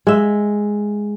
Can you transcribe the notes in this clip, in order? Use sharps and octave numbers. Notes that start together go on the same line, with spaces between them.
G#3 E5